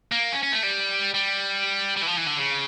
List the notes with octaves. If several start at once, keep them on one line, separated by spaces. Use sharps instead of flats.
A#3
C#4
C#4
A3
G3
G3
G3
E3
F3
E3
D3
C#3